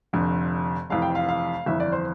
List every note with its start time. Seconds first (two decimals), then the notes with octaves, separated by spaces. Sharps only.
0.13 F1 F2 D3
0.90 F1 F2 E3 F5
1.02 G5
1.15 F5
1.29 F5
1.66 G1 F2 E3 E5
1.80 D5
1.92 C5